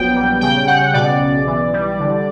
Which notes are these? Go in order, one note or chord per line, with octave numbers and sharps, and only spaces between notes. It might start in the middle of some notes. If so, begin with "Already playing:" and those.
Already playing: A#1 F#3 B3 G5
G3
C#3 G5
C#3 F#5
B2 D5
B1
E3
G3
D3